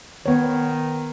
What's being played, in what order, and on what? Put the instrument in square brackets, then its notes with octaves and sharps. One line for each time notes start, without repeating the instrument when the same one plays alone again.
[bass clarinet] D#3 [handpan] B3 C#5